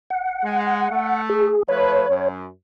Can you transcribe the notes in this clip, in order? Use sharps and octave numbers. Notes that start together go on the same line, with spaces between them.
F#5
G#3
A3
G#4
F3 A3 B4 C#5
F#2